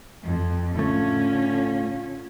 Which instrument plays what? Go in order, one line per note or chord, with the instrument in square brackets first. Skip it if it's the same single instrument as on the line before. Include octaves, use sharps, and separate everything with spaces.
[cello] F2
[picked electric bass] A2 A3 [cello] D3 C#4 [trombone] F4